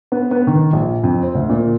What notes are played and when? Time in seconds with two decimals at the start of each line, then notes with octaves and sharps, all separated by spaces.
0.12 B3
0.31 B3
0.47 D#3
0.73 A#1
1.04 F2
1.23 C4
1.35 D2
1.49 A#2